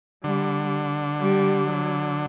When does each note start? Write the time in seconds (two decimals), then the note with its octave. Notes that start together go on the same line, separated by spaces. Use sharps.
0.24 D3 G3
1.20 G3
1.68 F#3